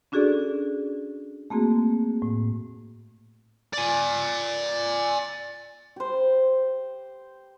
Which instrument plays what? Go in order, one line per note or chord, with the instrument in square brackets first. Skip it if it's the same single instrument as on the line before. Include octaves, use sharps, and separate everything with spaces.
[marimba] C#4 D4 F#4 G#4 A4 D5
A3 A#3 C4 F#4 G#4
A2
[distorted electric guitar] D5 G#5
[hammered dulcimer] G4 C5